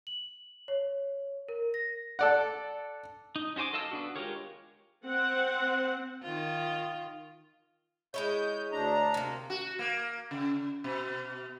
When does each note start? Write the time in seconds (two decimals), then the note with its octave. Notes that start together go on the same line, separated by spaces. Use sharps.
0.07 F#7
0.68 C#5
1.49 A#4
1.74 A#6
2.19 A4 D5 F#5
3.36 D#4
3.56 C#4 F#4 C5 G#5 D6
3.73 A4 D#5 F5 A5 E6
3.91 B3 D4 F#4
4.16 G#3 F4 G4 A#4 C#5
5.06 C4 F#5
6.23 D#3 F4
8.14 G#3 E4 C#5 G6
8.72 D2 D4 A#5
9.14 C3 A#3
9.50 F#4
9.79 A#3
10.31 C#3
10.84 B2